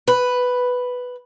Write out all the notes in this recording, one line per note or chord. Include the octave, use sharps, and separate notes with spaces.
B4